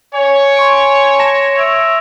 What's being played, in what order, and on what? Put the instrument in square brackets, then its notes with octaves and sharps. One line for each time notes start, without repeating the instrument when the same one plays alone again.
[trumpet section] C#5 [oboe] G#5
[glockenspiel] C6 C#6 D7
A5 A#6 E7
[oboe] E5 [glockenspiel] A#6 D7 F7